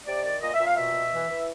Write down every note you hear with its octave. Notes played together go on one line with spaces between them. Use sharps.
C3 D5
D#3 D5
A#2 D#5
E5
A#2
F5
B2 E5
B2
E3
E3